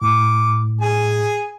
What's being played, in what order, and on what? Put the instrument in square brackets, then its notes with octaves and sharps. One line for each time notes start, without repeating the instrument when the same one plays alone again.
[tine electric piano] A2 [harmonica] D6
[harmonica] G#4 G#5